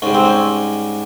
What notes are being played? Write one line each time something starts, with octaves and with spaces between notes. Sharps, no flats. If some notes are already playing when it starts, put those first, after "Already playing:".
G#2 G3 C#4
C4
C#4